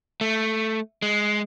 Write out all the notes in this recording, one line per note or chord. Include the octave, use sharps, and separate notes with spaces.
A3
G#3